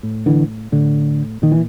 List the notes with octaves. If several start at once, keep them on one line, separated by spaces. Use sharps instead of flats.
A2
D3 E3
A2 D3
A#2 D#3
E3